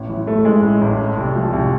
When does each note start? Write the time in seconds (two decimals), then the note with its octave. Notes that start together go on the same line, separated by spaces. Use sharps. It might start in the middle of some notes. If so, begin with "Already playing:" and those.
Already playing: A1
0.09 E3
0.27 E3 A3
0.45 A1 G#3
0.63 A2
0.82 A1
0.99 A3
1.17 C2
1.35 F3
1.53 C2